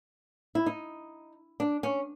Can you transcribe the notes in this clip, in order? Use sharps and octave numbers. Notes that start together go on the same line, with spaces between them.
E4
D#4
D4
C#4